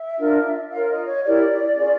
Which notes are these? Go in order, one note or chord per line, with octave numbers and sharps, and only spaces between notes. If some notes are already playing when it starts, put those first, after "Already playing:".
Already playing: E5
D4 F4 A#4
F4 A#4 C#5 F5
D#5
C#5
E4 G4 A#4 C#5 D5
C#4 F4 G#4